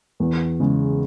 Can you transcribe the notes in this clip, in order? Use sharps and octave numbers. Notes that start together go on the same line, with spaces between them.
E2
C#3 G#3